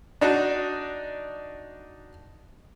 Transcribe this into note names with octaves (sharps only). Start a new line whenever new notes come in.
D4 D#4 F#4